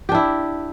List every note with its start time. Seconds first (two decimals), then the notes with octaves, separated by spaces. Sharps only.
0.09 G4
0.12 D4
0.15 E4